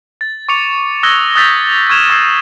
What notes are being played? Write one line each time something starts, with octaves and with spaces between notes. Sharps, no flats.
A6
C#6 D6 C#7 F7
D#6 E6 F#6 G#6 A#6 G7
D#6 E6 F#6 G6 A6 B6
C#6 F6 G#6 E7 F7
C#6 E6 G#6 C7